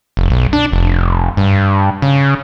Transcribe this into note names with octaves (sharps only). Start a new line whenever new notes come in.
F1
B1
D4
F1
G2
C#3